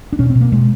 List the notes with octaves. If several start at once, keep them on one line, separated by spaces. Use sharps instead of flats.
D4
B2 C#4
C4
B2
A#3
B2 G#3